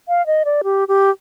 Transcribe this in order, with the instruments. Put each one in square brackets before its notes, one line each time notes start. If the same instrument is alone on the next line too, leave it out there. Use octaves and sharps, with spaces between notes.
[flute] F5
D#5
D5
G4
G4